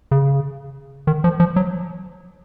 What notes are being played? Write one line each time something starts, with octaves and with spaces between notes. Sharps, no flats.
C#3
D#3
F3
F3
F#3